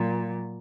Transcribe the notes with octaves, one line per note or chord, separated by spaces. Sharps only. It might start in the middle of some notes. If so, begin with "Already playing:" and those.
Already playing: A#2 F#3